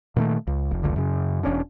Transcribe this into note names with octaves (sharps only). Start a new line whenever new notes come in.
A#2 D#3 G3 A3
C#2
F1
F1 C#2 D3
F#2 C#3
E1 C#4 D4